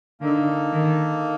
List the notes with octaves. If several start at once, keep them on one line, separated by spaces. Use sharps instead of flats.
D3 A#3 D#4 A4
D#3